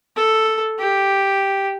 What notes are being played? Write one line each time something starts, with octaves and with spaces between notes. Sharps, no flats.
A4
G4